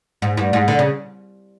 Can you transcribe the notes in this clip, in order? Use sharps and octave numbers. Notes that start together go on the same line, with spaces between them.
G#2
G2
G#2
D3
C#3